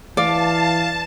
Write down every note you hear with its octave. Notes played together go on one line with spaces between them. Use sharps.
E3 D5 F5 A5